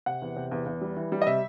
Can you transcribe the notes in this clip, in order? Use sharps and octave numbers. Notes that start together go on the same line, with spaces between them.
C3 F#5
E2
C3
E2
E2
G3
E3
G3
D#5
C3 E5